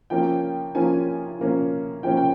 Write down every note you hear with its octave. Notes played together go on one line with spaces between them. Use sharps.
F3 A#3 C#4 G5
F3 A#3 C#4 G#5
F3 A#3 C#4
F3 A#3 C#4 G5
G5